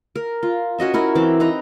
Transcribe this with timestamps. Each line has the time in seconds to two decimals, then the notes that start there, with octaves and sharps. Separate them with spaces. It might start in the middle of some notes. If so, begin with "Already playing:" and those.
0.16 A#4
0.43 F4
0.79 C#4 F#4 D#5 E5
0.94 C#4 E4 A#4
1.15 E3 C4 D6
1.40 C4 D#4 B4 A#5